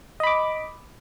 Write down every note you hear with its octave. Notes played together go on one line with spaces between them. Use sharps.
D#5 B5 D6